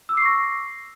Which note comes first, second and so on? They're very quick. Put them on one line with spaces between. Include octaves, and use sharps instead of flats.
E6 D6 C7 C#6 A#6